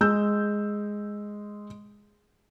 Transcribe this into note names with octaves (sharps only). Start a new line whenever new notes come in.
G#3 E6 G6